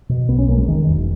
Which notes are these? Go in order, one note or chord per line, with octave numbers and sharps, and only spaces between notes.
B2
B1 B3
C#4
B1 A#3
G#3
E1 D#3
E1